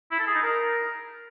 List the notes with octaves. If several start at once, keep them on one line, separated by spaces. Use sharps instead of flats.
E4
A4
G#4
D#4
A#4